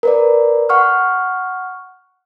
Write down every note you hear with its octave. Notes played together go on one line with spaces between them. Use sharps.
A#4 B4 D5
F#5 C#6 F6